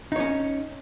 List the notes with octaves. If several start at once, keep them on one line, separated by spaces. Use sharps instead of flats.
C#4 D#4 C#5